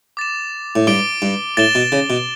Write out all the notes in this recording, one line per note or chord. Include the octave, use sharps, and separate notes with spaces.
D6 A6 E7
A2
G2 D6 A6 D7 G7
G2
A2 A6 E7 G7
B2
C#3
B2